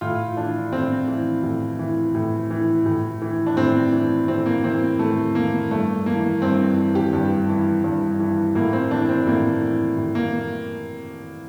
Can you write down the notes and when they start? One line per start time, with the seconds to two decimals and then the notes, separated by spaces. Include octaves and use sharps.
0.01 A2 F4
0.37 E3 D4
0.72 A2 C4
1.08 E3
1.43 A2
1.79 E3
2.15 A2
2.51 E3
2.86 A2
3.22 E3
3.46 D4
3.57 A2 C4
3.93 E3
4.28 A2 C4
4.46 A#3
4.64 E3 C4
4.99 A2 A3
5.35 E3 A#3
5.71 G2 A3
6.06 E3 A#3
6.42 G2 C4
6.77 E3
6.95 G4
7.13 G2
7.49 E3
7.84 G2
8.20 E3
8.55 A2 A#3
8.73 C4
8.91 E3 D4
9.09 C4
9.26 A2 A#3
9.62 E3
9.98 A2
10.15 A#3